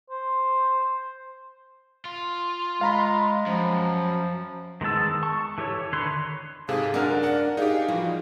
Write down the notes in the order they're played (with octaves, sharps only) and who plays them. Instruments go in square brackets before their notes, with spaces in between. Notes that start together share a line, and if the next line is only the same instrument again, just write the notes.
[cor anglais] C5
[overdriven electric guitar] F4
[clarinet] G#3 [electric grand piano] F5 A#5 B5
[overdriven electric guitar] F#2 [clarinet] F3
[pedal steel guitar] D#3 G#3 B3 A5 E6
A5 C#6
E3 G4 A4 C#5
D3 D#3 B4 C#5 C6
[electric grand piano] G#2 C3 G#4 [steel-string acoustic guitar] A4 [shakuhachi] F5
[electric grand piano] F#2 G#5 F6 [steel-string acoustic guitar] D4 A#4 [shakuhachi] F#5
[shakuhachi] D5 [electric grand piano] F#5
[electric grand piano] D#4 G4 [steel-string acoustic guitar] G#4 [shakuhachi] F5
[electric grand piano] E3 F3 F#4 [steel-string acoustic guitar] G3